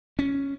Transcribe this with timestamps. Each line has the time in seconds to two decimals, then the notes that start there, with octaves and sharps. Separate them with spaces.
0.19 C#4